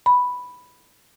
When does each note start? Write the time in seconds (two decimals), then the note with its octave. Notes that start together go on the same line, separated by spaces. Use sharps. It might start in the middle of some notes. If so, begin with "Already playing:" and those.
0.06 B5